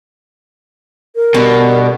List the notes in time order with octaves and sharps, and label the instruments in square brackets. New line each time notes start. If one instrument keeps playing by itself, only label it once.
[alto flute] A#4
[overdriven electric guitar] B2 [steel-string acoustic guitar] D3 G3